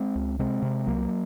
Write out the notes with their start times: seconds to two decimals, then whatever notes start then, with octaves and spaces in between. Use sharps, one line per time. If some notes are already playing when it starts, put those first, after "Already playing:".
Already playing: G#3 C4
0.15 C#2
0.39 C3 G#3 C4
0.62 C3
0.86 C2 F#3 A#3